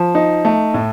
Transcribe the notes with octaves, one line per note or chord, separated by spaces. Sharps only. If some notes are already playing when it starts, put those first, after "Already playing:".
Already playing: F3
D#4
A3
A2